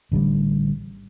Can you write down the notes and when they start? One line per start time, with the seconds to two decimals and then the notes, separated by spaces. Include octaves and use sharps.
0.12 A1 D3 F#3 G3